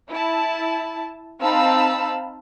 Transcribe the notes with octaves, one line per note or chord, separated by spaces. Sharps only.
E4 A5
C4 D#4 F5 A5 B5 E6